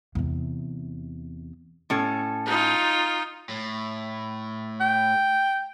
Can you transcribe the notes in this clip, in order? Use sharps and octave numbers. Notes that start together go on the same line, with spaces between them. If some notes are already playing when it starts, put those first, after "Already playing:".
E2 C3
A2 C#4 A4
D#4 F4
A2
G5